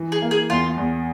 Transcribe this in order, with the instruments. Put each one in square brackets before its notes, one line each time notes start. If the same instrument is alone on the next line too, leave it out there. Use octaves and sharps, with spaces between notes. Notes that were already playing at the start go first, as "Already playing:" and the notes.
Already playing: [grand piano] E3
[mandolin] G#4
[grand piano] A#3
[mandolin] G#4
[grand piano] E2 [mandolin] F4
[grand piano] E2